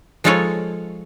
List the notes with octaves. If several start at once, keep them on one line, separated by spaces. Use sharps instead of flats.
F3 G#3 D#4 F4 A4 C#5